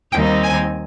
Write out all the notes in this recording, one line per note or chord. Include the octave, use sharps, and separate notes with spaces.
D#2 D#3 G3 C4 D#4 G5
G#5